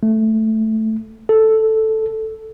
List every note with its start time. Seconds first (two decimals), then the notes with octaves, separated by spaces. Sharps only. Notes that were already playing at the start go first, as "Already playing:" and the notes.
0.03 A3
1.29 A4